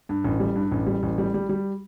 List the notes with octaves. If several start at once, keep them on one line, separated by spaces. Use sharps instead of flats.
G2
A1
G3
G2
A1
G3
A1
G3
G3
G3